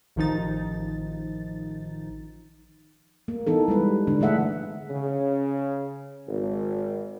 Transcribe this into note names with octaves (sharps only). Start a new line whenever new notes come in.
A1 D#3 F3 D#4 A6
A#3
E3 B3 D#4 A4
G3 G#3 B4
D3 D4
E3 A3 G#4 E5 F#5
C#3
G#1